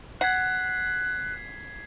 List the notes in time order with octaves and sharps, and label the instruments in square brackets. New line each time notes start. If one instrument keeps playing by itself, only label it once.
[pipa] F#5 [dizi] F#6 [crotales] G#6 B6 C7